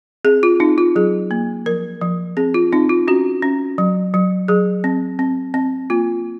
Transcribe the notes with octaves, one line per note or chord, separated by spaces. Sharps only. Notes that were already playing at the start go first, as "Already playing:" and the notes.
C4 G#4
F4
C4 D#4
F4
F#3 G#4
A#3
F3 A#4
F3
C4 G#4
F4
C4 D#4
F4
C#4 F#4
C#4
F#3
F#3
F#3 G#4
C4
C4
C4
A#3 F4